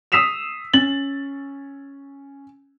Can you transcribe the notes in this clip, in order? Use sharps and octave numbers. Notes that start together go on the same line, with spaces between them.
D#6 E6 B6 C7 E7 F7
C#4 A6 F#7